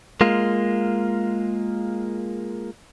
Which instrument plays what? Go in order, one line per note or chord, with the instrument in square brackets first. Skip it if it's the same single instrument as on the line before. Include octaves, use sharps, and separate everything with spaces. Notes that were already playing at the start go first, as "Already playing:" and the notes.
[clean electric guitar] G#3 A#3 F4